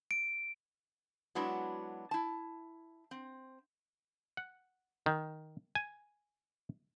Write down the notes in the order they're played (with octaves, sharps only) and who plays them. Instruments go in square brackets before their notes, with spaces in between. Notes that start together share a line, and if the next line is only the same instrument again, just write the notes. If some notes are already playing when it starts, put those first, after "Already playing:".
[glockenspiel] D7
[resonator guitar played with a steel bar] F#3 G#3 B3 D4 E4 F#4
E4 A5
C4
[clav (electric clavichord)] F#5
D#3
G#5